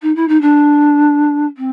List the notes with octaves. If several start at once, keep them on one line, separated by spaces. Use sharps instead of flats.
D#4
E4
D#4
D4
C4